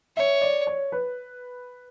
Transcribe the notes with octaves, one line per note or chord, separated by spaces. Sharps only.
C#5 E5
D5
C#5
B4